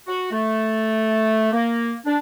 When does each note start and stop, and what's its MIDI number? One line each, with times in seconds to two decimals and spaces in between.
0.07 0.30 66
0.31 1.52 57
1.52 1.94 58
2.05 2.17 62